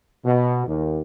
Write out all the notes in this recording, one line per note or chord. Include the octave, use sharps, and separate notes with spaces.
B2
D#2